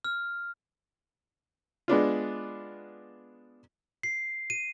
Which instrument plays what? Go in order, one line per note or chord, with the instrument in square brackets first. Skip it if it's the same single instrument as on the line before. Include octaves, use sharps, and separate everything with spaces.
[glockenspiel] F6
[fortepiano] G#3 B3 D4 F4
[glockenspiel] C7
D#7